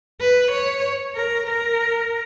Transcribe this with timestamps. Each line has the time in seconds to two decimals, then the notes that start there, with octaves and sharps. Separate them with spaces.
0.21 B4
0.52 C#5
1.15 A#4
1.47 A#4